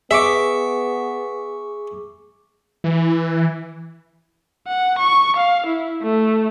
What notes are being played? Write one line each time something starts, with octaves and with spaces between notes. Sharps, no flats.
B3 G#4 E5 C#6 D6
E3
F#5
C#6
F5
E4
A3